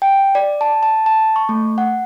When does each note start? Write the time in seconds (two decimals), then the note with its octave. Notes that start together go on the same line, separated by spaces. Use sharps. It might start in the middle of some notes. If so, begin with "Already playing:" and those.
0.02 G5
0.35 D5
0.61 A5
0.83 A5
1.06 A5
1.36 C#6
1.49 A3
1.78 F#5